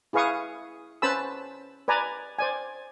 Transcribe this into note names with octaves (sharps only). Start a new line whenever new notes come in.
E4 G#4 B4 F5 C#6 D#6
C#4 B4 C5 A5 B5 E6
B4 D5 G#5 A#5
C5 D5 G#5